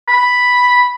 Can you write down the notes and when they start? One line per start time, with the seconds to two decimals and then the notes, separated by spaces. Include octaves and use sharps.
0.08 B5